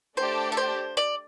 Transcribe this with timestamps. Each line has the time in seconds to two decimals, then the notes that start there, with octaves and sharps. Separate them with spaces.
0.16 A3 D4 G4 C5 D5 A5
0.52 A4
0.57 C5
0.97 D5